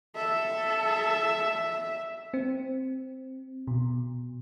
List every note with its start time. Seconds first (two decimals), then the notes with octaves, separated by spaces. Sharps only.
0.16 A4 E5
2.34 C4
3.67 B2